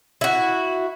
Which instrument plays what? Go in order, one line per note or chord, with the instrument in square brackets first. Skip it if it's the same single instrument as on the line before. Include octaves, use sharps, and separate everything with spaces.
[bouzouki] E4 F#4